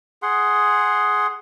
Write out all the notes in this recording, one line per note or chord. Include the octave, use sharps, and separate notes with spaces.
G#4 F#5 C6